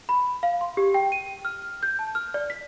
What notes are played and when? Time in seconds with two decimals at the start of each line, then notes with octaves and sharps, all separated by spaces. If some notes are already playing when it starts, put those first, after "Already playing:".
0.09 B5
0.43 F5
0.61 C6
0.77 G4
0.94 G5
1.12 D#7
1.45 F6
1.83 G6
1.99 A5
2.15 F6
2.34 D5
2.50 B6